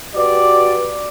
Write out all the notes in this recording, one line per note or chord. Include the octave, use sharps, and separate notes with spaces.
F#4 G4 B4 D5